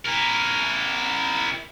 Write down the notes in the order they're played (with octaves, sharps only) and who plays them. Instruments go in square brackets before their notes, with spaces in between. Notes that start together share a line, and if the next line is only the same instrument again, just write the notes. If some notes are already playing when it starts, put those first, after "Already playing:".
[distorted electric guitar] E4 A#4